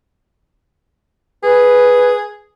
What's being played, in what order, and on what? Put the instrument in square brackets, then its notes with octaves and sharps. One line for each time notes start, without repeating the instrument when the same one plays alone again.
[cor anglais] G#4 [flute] B4